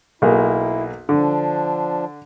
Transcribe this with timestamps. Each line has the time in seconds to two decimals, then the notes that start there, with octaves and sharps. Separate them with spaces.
0.22 B1 A#3 E4 G#4
1.09 D3 F3 D4